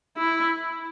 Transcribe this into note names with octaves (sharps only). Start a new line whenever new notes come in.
E4